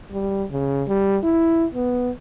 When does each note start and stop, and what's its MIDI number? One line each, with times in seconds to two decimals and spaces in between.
0.11 0.44 55
0.51 0.83 49
0.88 1.17 55
1.23 1.65 64
1.74 2.10 59